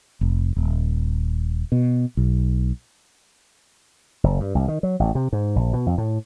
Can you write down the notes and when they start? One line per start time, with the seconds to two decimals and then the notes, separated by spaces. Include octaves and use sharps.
0.21 F1
0.56 D#1
1.72 B2
2.17 B1
4.24 F#1
4.40 G2
4.55 C2
4.68 D#3
4.83 F#3
5.00 A1
5.15 C3
5.33 G#2
5.56 A#1
5.73 B2
5.86 F2
5.98 A2